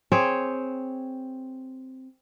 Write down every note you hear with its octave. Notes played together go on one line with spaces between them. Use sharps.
C4 G#4 C#5